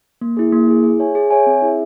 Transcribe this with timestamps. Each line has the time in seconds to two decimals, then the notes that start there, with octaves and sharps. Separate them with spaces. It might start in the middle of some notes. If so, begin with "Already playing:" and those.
0.21 A#3
0.37 E4 G#4
0.52 A#3
0.68 E4 G#4
0.84 G#4
0.99 C#5 E5 G#5
1.15 G#4
1.31 C#5 E5 G#5
1.47 C4
1.62 E4 G#4 E5